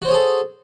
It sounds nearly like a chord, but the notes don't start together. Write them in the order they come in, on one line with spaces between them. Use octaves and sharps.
F#4 C5 C#5 G#4 A4